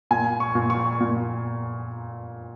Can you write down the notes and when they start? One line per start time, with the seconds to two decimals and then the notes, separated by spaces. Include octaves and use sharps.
0.11 A#2 G#5
0.40 C#6
0.55 A#2
0.70 C#6
1.00 A#2